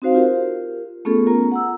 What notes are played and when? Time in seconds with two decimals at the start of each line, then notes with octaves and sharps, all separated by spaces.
0.02 C4 D#4 F#4 C5 F5
0.15 F4 G4 A#4
1.05 A3 B3 C#4 F4 G#4 A4
1.27 B3 F4 A#4 A#5
1.52 F#5 A#5 E6